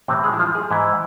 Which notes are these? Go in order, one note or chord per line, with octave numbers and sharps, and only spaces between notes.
A2 C3 E3 C4
G#3 G#4
E4
F3 F4
G#3 G#4
G#2 E3 E4